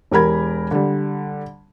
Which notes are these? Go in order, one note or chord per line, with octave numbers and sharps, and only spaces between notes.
E1 G4 A#4 B5 G#6
D3 G3